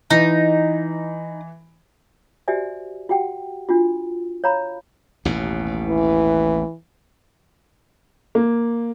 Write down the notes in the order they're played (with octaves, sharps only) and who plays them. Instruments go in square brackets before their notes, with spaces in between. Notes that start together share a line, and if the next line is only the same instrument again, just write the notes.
[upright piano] E3 [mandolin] D#4
[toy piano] F#4 G4 C5 D5 E5 G#5
F#4 G4 F#5 G5
D4 F4 F#4
C#5 F5 A#5 B5
[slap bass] A1 D#2 B2
[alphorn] E3
[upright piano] A#3